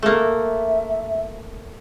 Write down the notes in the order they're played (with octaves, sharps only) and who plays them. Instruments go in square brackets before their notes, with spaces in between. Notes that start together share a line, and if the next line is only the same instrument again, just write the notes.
[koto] A3 A#3 [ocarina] E5